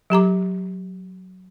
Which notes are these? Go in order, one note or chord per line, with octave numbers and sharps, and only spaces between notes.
F#3 G4 A#5 D6